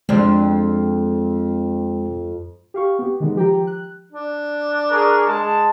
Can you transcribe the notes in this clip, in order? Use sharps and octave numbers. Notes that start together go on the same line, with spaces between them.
F2 G#3 C4 D4
G4 F5 C#6
B3 G4
D#3 G#3 B3
F3 G4 G5 A#5
F#6
D4
G#4 A#4 C#6
G#3 A5